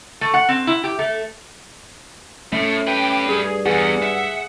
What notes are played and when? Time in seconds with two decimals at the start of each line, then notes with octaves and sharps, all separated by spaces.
0.21 A3
0.34 F#5
0.49 C4
0.67 E4
0.84 G4
0.99 A3
2.53 A2 A3 C#4
2.87 G4 B4 G5
3.29 G2 G#4
3.66 E2 G#4 F#5
4.03 E5